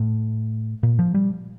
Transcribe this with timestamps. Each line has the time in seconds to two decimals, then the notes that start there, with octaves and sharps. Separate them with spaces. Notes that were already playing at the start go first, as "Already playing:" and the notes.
Already playing: A2
0.83 A#2
0.99 F3
1.14 G3